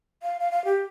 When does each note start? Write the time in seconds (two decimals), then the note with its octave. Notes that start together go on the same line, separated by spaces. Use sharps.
0.23 F5
0.40 F5
0.51 F5
0.65 G4